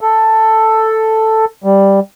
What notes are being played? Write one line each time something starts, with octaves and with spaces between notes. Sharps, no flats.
A4
G3